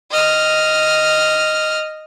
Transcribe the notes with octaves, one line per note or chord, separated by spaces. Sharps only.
D#5 F6